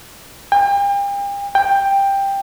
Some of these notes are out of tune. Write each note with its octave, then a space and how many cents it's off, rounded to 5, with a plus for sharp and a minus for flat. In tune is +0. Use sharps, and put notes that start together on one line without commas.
G5 +40
G5 +10